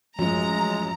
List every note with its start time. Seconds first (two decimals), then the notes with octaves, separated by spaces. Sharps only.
0.19 A1 F#2 F3 G#3 A#5